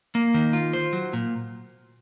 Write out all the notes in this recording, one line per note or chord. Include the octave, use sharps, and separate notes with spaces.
A#3
D#3
F4
C5
F#3
A#2